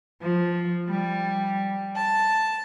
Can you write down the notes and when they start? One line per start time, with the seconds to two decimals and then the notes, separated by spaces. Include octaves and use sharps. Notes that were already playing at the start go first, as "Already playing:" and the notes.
0.22 F3
0.89 G3
1.96 A5